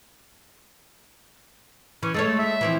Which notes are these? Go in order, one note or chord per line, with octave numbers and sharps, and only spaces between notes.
E3 C#4
G#3 A3 A4 C#5
E5
E3 F3 C4